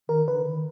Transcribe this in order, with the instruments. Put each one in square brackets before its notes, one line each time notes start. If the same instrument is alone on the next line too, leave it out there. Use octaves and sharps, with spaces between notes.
[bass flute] D#3 [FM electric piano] A#4
[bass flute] D3 [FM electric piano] B4
[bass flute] D#3